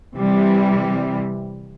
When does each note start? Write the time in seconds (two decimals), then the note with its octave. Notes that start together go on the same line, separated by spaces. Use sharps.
0.17 C3 E3 G3